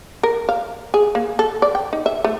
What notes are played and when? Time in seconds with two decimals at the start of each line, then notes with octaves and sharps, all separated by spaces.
0.23 A#4
0.49 F5
0.94 G#4
1.15 A#3
1.39 A4
1.62 D5
1.75 G5
1.93 D#4
2.06 E5
2.24 A3